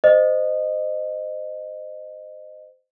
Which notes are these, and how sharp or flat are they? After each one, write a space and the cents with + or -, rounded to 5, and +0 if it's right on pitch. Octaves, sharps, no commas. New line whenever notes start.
C5 -20 D#5 -20